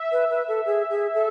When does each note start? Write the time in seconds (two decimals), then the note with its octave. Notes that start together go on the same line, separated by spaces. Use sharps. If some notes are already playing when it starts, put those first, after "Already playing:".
Already playing: E5
0.12 B4
0.30 B4
0.48 A4
0.66 G#4
0.90 G#4
1.14 A4